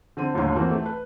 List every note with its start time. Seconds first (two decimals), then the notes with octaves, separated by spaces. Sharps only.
0.17 D3 C4 D#7
0.34 G1 D#2 A2 D3 C#5 C6
0.56 E3 A#3 C4 F#4
0.71 A3
0.86 B4